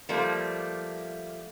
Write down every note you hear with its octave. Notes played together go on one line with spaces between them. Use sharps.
F3 G3 A3 A#3